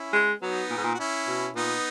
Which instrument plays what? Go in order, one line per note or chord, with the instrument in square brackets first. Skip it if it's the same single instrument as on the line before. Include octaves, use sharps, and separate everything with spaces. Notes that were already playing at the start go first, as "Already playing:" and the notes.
Already playing: [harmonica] C#4 E4
[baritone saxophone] G#3
[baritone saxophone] F#3 [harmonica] B3 D#4
[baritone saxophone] A#2
G#2
A#2
[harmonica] F#4
C#4 E4
[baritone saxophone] B2
[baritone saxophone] A#2 [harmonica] B3 D#4